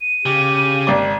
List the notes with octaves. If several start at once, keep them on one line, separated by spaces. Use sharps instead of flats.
D#7
C#3 G4
G#1 D5